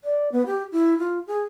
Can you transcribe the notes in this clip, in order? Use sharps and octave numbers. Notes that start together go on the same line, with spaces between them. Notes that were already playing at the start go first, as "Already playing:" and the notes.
D5
B3
G4
E4
F4
G#4